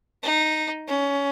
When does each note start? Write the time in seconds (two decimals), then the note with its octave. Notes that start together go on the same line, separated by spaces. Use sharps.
0.23 D#4
0.88 C#4